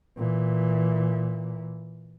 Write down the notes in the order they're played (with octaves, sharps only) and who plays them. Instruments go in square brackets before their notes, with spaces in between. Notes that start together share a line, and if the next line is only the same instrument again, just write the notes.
[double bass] A#2 E3